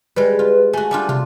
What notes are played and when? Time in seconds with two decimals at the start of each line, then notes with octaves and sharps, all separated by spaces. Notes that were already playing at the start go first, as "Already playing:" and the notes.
0.16 G3 G#3 B4
0.39 F4
0.73 A3 F#4 G#5
0.91 G3 D4 F4
1.09 C3 F4